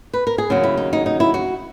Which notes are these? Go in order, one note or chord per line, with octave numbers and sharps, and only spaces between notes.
B4
A#4
G#4
D#2 C#3 F#3 F#4
E4
D#4
D#4
D#4
E4
F#4